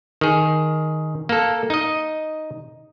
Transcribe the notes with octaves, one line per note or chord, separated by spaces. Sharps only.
D#3 G#4
A#3 A4
D#4 D#5